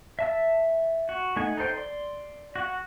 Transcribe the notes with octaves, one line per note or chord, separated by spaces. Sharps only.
E5 A5 E6
F#4
A3 D#4 F#5 G#5
D#4 A4 C5 G5
D5 C6
F#4 F#5